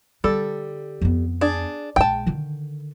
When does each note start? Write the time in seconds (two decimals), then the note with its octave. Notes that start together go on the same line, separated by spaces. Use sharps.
0.24 D3 G3 A4
1.01 F2 B3
1.41 D4 G#4
1.96 A#1 G#3 G5 A5
2.26 D3 D#3